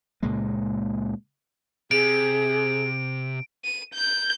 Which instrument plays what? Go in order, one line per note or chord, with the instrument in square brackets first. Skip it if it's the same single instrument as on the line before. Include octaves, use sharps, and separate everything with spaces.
[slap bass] C#2 A#2 G#3 A#3
[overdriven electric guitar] C3 [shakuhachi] G#4 [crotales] D7
[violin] D#7
G6